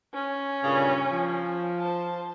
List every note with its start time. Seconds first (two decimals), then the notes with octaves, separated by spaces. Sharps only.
0.13 C#4
0.64 G2 A#2 C#3
1.10 F3
1.79 C5 A5